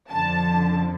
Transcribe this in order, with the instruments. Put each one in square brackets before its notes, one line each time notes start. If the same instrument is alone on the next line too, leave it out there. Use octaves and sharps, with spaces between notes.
[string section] F2 D3 F3 A5